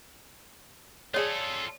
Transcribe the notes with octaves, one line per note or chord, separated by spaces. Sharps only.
F4 G#4 A4 C#5 D5 D#6